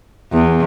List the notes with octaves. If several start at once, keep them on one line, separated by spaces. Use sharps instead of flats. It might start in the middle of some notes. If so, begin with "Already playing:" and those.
E2